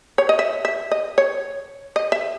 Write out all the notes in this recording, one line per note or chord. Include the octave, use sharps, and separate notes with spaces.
C#5
D#5
E5
E5
D#5
C#5
D#5
E5